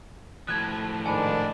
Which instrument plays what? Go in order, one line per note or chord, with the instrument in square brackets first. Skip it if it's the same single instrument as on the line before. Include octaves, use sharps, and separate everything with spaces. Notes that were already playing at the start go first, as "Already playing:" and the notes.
[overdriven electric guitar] A2 F3 [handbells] F#6 G#6
[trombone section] G#2 D#3 [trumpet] D4 [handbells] G#5 B5